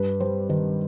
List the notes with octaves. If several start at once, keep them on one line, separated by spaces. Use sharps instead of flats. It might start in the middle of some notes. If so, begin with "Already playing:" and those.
Already playing: G2 B4
G3 C5
D#3 B4